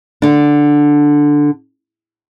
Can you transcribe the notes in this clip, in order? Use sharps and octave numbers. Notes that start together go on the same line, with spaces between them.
D3 D4